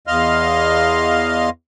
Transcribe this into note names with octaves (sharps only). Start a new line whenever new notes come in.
E2 D#5 F5 C6 F6